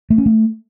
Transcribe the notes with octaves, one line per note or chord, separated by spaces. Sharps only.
A3
C#4
A3